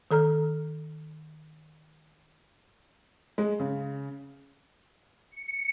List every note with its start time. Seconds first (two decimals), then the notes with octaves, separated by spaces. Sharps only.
0.11 D#3 A4 A#5 F6
3.38 G#3
3.60 C#3
5.31 C#7